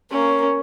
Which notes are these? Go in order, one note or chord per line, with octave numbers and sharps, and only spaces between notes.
A#3 C#4